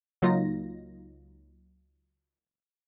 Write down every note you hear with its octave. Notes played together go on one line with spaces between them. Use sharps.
C#2 F#3 A#3 D#4 F4 A#6